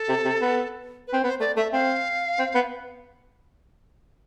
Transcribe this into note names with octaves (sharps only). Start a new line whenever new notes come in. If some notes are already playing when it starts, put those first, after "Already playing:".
Already playing: A4
C3
C3
B3
B4
C4
B3 C5
A3 D5
A3 E5
C4 F5
C4
B3